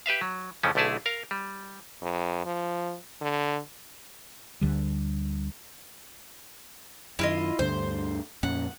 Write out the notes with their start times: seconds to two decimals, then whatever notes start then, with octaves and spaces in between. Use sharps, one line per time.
0.06 G4 B4 E5 F5
0.21 F#3
0.63 F2 C#3 E3 F3 A3 C#4
0.75 B1 D3 A3 E4 G#4 A5
1.06 A#4 F5
1.31 G3
2.02 F2
2.45 F3
3.21 D3
4.61 D2 D3 G3
7.19 F#2 D#3 E4 F4 D#5
7.59 D2 G2 D3 C5
8.43 F2 A#2 C#4 F#5